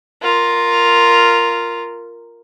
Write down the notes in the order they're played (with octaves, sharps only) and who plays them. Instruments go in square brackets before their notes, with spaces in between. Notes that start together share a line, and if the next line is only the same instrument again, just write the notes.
[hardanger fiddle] F4 A#4